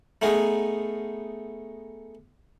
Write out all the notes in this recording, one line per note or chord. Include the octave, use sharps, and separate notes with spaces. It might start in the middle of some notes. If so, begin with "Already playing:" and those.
A3 B3 D#4 G#4 A#4